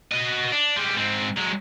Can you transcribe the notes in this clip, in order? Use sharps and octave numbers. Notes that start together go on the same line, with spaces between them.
F#4 D#5
D4
G3 G#3
G#2 C4
F#3 G#3